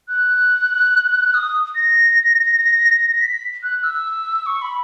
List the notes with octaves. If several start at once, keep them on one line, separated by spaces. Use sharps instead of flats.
F#6
D#6
A#6
B6
F#6
E6
C#6
B5